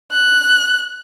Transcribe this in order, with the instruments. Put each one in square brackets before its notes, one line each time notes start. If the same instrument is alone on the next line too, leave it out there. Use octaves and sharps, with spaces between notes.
[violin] F#6